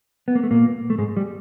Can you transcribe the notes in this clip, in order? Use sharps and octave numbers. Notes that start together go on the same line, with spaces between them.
B3
A#3
A3
A#2 A#3
A3
G#2 G#3
G3